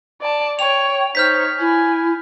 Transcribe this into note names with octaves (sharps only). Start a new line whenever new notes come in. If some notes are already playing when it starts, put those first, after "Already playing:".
D5 A5
C#5 G5 F7
D#4 C5 C#5 F6 G6 B6
E4 G#5